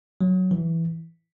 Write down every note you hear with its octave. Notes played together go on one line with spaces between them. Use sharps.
F#3
E3